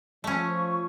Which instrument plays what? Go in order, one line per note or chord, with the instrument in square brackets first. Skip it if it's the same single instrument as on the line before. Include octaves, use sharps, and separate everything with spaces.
[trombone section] F3 [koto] A3 C#4 [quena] C#6